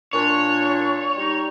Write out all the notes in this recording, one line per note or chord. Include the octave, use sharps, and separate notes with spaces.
A#2 D4 C#5
G3 D#4